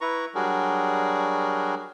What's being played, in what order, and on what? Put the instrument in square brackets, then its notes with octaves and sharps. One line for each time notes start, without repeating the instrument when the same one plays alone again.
[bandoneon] E4 B4 A#5 C#6
F#3 G3 D4 F#4 G#4 A#4